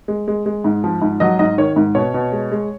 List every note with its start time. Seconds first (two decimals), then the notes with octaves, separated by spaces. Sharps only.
0.08 G#3
0.28 G#3
0.46 G#3
0.64 G#2
0.84 F3
1.02 G#2
1.20 F#3 D#5
1.39 G#2 D#5
1.58 D#3 C#5
1.76 G#2
1.95 B2 C#5
2.14 B2
2.32 G#3
2.52 G#3